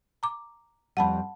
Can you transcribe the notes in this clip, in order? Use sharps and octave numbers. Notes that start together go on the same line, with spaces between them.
A#5 D6
F2 G3 F#5 A5 B5